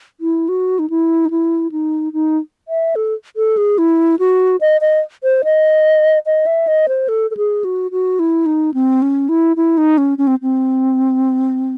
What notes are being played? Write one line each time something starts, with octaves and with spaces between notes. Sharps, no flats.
E4
F#4
D#4
E4
D#4
E4
D#4
D#4
E5
A4
A4
G#4
E4
F#4
D#5
D#5
C5
D#5
D#5
E5
D#5
C5
A4
A4
G#4
F#4
F#4
E4
D#4
C4
C#4
E4
E4
D#4
C#4
C#4
C4
C4